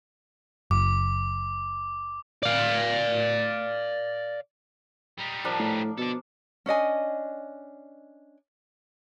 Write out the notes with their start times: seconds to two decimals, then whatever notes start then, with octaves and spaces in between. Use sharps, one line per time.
0.71 F#1 D6
2.43 D5 F5
5.18 G3 D#4
5.44 F3 D4 A#4
5.60 A2
5.98 B2 A4 D5
6.66 C#4 D4 D#5 G#5